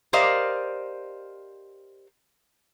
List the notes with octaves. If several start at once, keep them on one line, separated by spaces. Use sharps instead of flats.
G4 A#4 C5 D5 D#5 F5